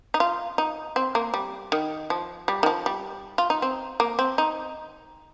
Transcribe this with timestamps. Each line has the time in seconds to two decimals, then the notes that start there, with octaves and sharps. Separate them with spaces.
0.14 D#4
0.20 F4
0.58 D#4
0.96 C4
1.15 A#3
1.34 G3
1.72 D#3
2.10 F3
2.48 G3
2.63 D#3
2.66 F3
2.86 G3
3.38 F4
3.50 D#4
3.62 C4
4.00 A#3
4.19 C4
4.38 D#4